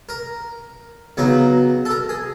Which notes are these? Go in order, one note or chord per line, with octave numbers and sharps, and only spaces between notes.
A#4
C#3 F#3 B3 D#4
A4
A#4
G#4